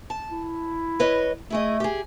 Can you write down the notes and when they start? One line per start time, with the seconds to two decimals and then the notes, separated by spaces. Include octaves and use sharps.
0.10 A5
0.32 E4
1.00 B4 C#5 D#5
1.50 A3 E4 G#4 D#5
1.80 G4 G#4